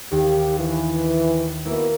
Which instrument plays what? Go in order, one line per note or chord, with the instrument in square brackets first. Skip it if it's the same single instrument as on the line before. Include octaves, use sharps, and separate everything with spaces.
[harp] D#2 [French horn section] G4
[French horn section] E3
[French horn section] B2 E3 [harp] A#3 E4